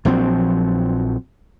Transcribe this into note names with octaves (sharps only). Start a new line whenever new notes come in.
A#1 F3 F#3 C4